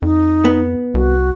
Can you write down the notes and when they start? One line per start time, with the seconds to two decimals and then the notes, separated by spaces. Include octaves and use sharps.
0.02 F2 D#4
0.45 B3
0.94 C2 F#4